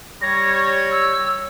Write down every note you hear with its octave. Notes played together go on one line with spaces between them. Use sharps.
G3 C#5 A#6
E6